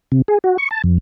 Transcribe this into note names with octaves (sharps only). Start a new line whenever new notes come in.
C3
G#4
F#4
C#6
A5
F2